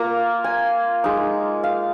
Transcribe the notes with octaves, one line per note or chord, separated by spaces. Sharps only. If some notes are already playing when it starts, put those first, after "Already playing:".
Already playing: A#3 F4 A#5
G#5
G#3 D#4
F5